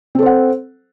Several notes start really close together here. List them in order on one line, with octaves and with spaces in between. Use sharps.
C4 A4 C5 F#5